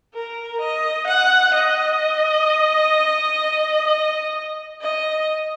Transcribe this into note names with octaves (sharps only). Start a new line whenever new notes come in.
A#4
D#5
F#5
D#5
D#5
D#5